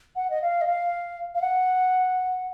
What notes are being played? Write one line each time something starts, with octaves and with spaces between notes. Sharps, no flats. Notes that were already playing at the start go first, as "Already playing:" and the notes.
F#5
D#5
F5
D#5
F5
F5
F#5